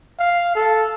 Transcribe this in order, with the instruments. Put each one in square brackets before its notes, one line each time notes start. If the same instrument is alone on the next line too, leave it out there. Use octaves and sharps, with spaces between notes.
[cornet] F5
A4